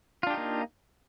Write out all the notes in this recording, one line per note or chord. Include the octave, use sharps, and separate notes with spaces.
A#3 D4 D#4 F4 G4